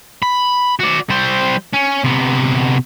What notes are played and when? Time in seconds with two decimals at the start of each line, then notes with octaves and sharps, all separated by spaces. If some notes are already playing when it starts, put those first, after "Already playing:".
0.22 B5
0.80 F#4 D5
1.10 G3 C5
1.73 C#4
2.04 C3 B3